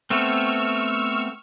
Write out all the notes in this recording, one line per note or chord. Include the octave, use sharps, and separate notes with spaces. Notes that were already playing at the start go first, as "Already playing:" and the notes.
A3 B3 C4 C#6 E6 F6